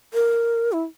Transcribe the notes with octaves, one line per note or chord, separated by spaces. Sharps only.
A#4
E4